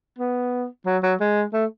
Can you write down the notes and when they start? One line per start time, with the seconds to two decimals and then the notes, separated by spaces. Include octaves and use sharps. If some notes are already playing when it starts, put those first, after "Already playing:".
0.18 B3
0.86 F#3
1.03 F#3
1.20 G#3
1.53 A3